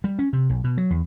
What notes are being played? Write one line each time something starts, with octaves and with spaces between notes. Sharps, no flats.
G3
C#4
C3
B1
B2
F#3
E2